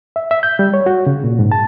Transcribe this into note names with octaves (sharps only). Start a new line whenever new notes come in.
E5
E5
G6
G3
C#5
F#4
C#3
A#2
G#2
A5